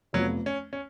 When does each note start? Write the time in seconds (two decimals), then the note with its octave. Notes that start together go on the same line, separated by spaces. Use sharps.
0.13 F1 F2 F3 F#3 B3
0.46 C#4
0.73 C#4